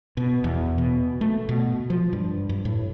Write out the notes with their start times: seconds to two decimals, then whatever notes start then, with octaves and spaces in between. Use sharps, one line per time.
0.17 B2
0.44 E2
0.78 B2
1.21 A3
1.49 B2
1.90 F3
2.13 G2
2.49 G2
2.65 A2